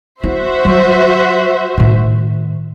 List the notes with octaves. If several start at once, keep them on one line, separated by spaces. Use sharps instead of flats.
E4 F#4 C5 E5
F#3
A2 D#3